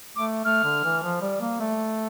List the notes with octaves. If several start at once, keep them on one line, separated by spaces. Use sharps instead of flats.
A3 D6
A3 F6
D3
E3
F3
G3
A#3
A3